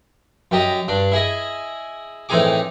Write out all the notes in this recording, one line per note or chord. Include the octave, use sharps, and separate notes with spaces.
F#2 G4 D#5 A#5
G2 D4
E4 G#4 D#5
A2 E3 C4 D#4 G#4 D6